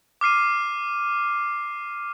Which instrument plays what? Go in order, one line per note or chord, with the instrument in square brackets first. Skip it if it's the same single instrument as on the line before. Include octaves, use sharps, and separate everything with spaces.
[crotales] D6 F6 C7 D#7